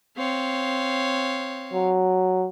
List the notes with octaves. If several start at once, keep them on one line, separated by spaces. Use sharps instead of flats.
C4 C#5 F5
F#3